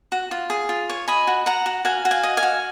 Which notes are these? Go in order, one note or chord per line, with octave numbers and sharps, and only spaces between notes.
F#4
F4
G#4
F4
C#5
D#5 G#5 B5
F#4
F#4 F#5 A#5
F#4
F#4 F5 G#5
F#4
F5 G#5
D#5
F5 G#5
F#4